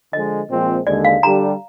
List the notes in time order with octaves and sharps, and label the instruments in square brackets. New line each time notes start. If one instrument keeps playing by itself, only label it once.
[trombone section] D3 F3 G#3 [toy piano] D#5
[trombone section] A#2 F3 G#3 C4
[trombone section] D#2 D3 G#3 [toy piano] D5
[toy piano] F5
[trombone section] D3 G3 D4 G4 [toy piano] A#5